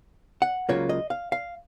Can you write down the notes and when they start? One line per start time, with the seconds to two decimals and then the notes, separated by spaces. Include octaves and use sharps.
0.42 F#5
0.69 C#2 C#3 F#3 A#3 F4 C#5
0.89 D#5
1.10 F5
1.32 F5